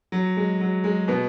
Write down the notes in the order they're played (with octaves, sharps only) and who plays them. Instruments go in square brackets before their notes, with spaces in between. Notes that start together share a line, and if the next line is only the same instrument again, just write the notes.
[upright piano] F#3
G#3
F#3
G#3
B2 B3